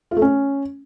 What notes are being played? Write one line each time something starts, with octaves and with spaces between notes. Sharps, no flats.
F4
A3
C#4